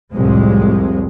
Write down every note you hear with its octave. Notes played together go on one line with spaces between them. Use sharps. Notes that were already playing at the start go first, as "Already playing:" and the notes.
C2 F2 A2 G#3